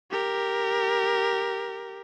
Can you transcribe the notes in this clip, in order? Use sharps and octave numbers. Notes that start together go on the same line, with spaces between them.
G4 A#4